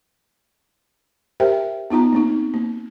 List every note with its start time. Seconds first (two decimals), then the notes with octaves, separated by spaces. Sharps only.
1.40 G4 A#4 C5 E5 G5
1.90 B3 D#4 F4 A#5
2.13 A#3 C4 D#4
2.54 A#3